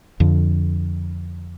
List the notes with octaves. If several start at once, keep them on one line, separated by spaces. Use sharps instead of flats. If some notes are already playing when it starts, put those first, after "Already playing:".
F2 D3